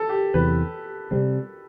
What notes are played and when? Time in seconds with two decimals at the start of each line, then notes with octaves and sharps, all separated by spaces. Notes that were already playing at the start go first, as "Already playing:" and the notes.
Already playing: A4
0.09 G4
0.34 E2 C3 F#3 B4
1.11 C3 G3 C4